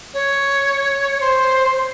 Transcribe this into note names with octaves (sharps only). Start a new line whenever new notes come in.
C#5
C5